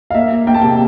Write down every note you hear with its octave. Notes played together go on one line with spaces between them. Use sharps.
F5
A#3 E5
A#3
A#3 G5
A5
C3 G5